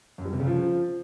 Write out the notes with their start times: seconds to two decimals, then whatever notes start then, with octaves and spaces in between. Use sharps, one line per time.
0.18 F#2
0.25 G3
0.33 C3
0.40 C#3
0.47 F3